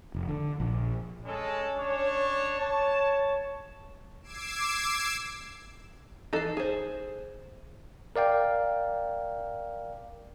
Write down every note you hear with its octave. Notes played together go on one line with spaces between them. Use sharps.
F1
D3
A#1
G#3 C#4 G#4 A4
D4 C#5
C#5 A5
D6 E6 G#6 C7 D7 E7
E3 D#4 A4 C7
G#4 C5
A#4 D5 F5 G5